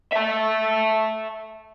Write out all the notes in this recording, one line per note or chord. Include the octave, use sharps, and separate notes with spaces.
E5 A5